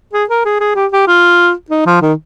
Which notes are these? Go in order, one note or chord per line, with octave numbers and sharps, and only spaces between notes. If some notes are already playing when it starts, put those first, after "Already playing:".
G#4
A#4
G#4
G#4
G4
G4
F4
D#4
F3
D#3